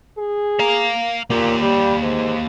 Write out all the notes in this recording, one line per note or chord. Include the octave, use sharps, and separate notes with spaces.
G#4
F5 A#5
A#2 A#3 G4
G3
G#2